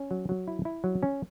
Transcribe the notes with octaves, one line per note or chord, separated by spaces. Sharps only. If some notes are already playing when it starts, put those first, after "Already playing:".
Already playing: C#4
F#3
F#3
E4
E4
F#3
C#4